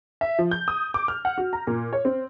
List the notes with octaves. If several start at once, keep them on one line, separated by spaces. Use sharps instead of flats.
E5
F3
G6
D#6
D6
F6
F#5
F#4
A#5
A#2
C#5
C4